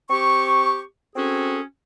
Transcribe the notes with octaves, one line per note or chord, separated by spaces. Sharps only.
C4 G4 C#6
C4 C#4 F#4 G#4 A4